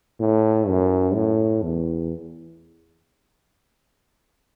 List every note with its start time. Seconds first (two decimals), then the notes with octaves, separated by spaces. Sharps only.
0.20 A2
0.68 F#2
1.15 A2
1.63 E2